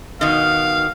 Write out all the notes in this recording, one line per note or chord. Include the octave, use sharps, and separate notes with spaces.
B2 D#3 F5